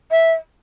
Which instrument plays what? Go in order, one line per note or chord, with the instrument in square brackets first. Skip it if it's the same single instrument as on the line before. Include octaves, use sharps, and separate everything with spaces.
[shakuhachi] E5